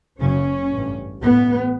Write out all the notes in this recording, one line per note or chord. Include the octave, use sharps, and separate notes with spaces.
F#1 F#2 C#3 C#4
A1 G2
A1 A2 B3